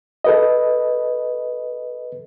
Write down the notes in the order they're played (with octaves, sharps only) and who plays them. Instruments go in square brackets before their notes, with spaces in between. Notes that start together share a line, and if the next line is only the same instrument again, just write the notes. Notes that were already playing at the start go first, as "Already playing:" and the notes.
[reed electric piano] A4 B4 D#5